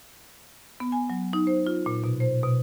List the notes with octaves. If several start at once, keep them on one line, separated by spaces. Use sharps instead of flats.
B3
G#5
F#3
D#4
C5
F4
A#2
B2
C5
B2